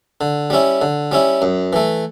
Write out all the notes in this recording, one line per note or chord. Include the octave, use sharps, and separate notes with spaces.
D3
G3 C#4 E4
D3
G3 C#4 E4
F#2
E3 A3